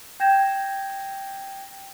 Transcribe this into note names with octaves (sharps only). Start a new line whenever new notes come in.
G5 G6 G#6 A#6 E7